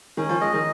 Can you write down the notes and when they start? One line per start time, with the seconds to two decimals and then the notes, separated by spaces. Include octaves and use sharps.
0.17 D#3 C#4
0.29 F3
0.41 G#3 D#5
0.54 D#3